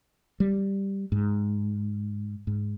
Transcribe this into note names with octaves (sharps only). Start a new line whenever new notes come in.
G3
G#2
G#2